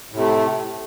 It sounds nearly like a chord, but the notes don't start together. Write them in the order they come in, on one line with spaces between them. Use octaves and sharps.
A2 C3 A3